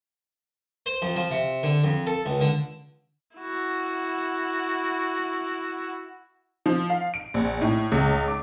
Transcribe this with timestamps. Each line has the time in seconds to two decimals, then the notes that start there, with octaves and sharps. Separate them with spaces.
0.86 C5
1.02 F2
1.16 F3
1.31 C3
1.63 D3
1.84 F2
2.07 A4
2.26 C#2
2.41 D3
3.36 E4 F#4
6.66 F3
6.90 F5
7.14 D7
7.34 A#1
7.61 A2
7.92 C#2
8.28 D6